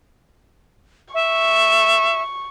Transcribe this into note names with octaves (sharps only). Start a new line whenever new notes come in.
E5 C#6